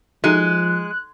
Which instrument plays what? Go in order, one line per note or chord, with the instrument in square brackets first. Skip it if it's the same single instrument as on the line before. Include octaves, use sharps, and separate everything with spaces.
[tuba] F3 [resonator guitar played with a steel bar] G#3 [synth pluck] D#4 F#4 A4 [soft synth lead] F#6